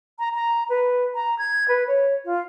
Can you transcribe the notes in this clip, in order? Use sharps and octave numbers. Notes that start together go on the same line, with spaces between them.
A#5
A#5
B4
A#5
G#6
B4
C#5
F4